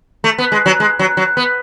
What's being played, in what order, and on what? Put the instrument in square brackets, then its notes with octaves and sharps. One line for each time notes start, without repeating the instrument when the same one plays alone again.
[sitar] A3
B3
G#3
F#3
G#3
F#3
F#3
B3